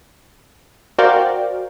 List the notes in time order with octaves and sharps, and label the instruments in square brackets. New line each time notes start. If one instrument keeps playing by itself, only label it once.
[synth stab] F#4 A#4 C5 D5 F5 G5